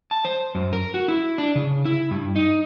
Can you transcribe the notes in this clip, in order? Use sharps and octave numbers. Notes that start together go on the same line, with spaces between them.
A5
C5
F#2
A#4
F#4
E4
D4
C#3
E4
G2
D#4